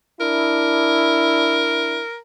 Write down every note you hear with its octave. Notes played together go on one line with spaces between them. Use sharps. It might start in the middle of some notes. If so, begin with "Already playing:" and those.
D4 E4 A#4